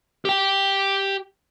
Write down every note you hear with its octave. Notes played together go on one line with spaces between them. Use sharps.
G4 G5